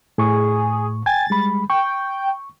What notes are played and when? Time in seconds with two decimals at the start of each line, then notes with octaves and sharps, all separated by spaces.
0.18 A2 G#4 C#6
1.06 G5 G#5 G#6 A6
1.30 G3 G#3 B5
1.70 G5 C#6